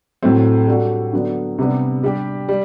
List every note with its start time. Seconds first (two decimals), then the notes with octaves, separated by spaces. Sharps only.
0.23 A2 F#3 A3 C4
0.67 G3 D4 F#4 A4
1.13 D3 F#3 B3 D4
1.59 C3 G3 B3 D4
2.03 G3 D4 G4
2.49 G3